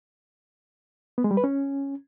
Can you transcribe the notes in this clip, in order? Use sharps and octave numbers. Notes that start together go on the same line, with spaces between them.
B3
G#3
G3
B4
C#4